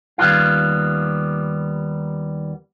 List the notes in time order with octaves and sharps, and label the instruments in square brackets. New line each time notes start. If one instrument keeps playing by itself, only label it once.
[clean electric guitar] D#2 G3 B3 F4 F5